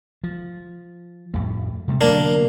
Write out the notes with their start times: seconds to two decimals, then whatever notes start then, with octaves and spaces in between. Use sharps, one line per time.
0.24 F3
1.34 F2 A2 G3
1.88 C3 G3 A3
2.01 B2 D3 F#3 A#3 D4